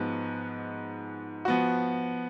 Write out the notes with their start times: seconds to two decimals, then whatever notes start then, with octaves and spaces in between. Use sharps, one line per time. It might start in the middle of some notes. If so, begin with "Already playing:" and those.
Already playing: G#2 F3 G#3 B3 F#4
1.45 F3 B3 F#4